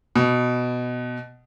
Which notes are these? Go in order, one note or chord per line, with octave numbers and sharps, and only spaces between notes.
B2